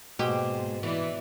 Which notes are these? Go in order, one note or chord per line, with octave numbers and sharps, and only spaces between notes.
G#2 B2 A#3 G4 G#4 C5
E3 E4 B4 D5